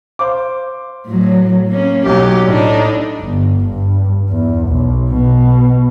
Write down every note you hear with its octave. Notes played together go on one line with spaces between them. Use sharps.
C5 F5 D6
A2 F#3
A#3 C#4
B1 F#3 G4
A2 D4 D#4
G1
G2
E2
B1
B2